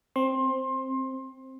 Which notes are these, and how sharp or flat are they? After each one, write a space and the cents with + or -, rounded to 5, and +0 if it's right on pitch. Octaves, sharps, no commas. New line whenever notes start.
C4 +10 C6 +25